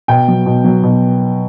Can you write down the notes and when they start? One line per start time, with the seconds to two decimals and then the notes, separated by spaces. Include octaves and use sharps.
0.08 B2 G5
0.28 F#3
0.46 B2
0.65 F#3
0.83 B2